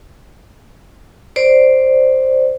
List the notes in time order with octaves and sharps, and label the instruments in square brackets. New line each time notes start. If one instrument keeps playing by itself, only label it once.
[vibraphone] C5 D5